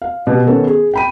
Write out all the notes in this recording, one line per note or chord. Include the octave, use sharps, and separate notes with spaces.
F5
B2 G4
D#3 B3 C#4 A4
G#4
G5 B5 D#7